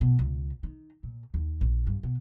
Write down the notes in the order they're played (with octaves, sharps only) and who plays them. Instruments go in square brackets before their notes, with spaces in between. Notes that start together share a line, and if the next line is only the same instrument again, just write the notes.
[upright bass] B2
C#2
D#3
A#2
D#2
A#1
G2
B2